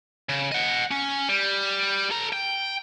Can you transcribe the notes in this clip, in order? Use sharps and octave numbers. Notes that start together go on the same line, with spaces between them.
C#3
D#5 F#5
C#4
G3
A4 A#5
G5